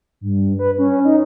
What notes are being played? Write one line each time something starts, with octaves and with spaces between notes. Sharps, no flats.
G2
B4
C#4
D#4